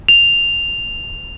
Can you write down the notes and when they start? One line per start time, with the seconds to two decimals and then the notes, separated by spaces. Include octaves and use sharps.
0.08 F7